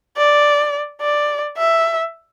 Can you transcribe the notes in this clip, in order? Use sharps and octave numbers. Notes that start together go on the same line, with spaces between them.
D5
D5
E5